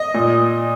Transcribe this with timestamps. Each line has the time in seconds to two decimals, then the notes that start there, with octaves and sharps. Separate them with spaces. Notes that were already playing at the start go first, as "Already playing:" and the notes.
Already playing: D#5
0.14 A#2